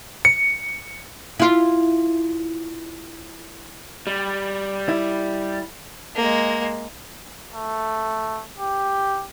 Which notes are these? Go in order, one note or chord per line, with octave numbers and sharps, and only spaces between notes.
C#7
E4 F4
G3
E4
G#3 A#3
A3
G4